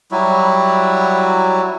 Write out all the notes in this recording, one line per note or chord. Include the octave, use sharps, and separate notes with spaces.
F#3 G3 E4 F#4